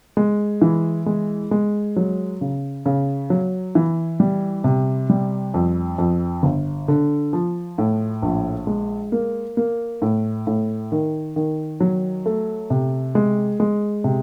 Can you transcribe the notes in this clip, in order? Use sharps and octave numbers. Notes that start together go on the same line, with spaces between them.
G#3
E3
G#3
G#3
F#3
C#3
C#3
F#3
E3
G3
C3
G3
F2
F2
G1
D3
F3
A2
A#1
G#3
A#3
A#3
A2
A2
D#3
D#3
F#3
A3
C3
G#3
G#3
C3